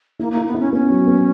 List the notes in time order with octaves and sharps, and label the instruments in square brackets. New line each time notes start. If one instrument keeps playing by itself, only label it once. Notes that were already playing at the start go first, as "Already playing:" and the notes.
[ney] A#3 [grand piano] E4
[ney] A#3
[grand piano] E4
[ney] B3
[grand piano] E4
[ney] C#4
[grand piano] B3 [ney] C#4
[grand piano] F#3
B3